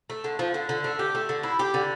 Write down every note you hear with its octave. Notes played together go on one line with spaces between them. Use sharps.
A3
D3
F3
D3
D3
A3
G4
A3
D3
E4
G4
D3